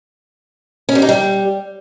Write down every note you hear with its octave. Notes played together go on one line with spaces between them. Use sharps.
C#4
G3
D#4
G3